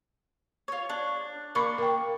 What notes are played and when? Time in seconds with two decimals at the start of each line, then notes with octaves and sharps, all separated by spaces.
0.68 F4 C#5
0.89 D4
1.55 A#3 D4 A#4 B5 C#6
1.78 A#4 G5